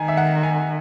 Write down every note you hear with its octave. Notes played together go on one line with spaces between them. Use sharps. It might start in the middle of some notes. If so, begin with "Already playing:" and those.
Already playing: D#3 G#5 A#5
E5
F#5
G#5